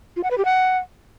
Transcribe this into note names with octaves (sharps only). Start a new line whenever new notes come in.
F4
F#5
B4
G4
F#5